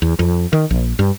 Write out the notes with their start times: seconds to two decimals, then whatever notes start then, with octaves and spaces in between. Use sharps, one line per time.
0.02 E2
0.19 F2
0.53 D#3
0.70 A#1
0.99 G2